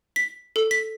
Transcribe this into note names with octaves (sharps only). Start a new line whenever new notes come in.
B6
A4
B6